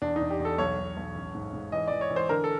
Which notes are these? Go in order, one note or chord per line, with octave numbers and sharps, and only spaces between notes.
E2 D4
D#4
E2
G4
E2
A4
B1 C#5
B1
B1
A1
G#2
G#2
E3 D#5
E3 D5
C#5
E3
C5
D3 A#4
A4